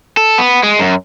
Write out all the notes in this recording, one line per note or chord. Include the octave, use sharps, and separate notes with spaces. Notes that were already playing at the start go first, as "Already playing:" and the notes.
A4
B3
G#3
F#2